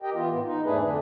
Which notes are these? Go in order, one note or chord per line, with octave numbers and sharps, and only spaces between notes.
G4 A#4 D#5 G5
E3 B3 F4
A2 B3
D#4
E2 G#2 A3 D4 G#4 B4
F2 D3 D4